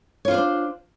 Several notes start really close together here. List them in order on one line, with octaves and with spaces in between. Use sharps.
C#5 F4 C5 D4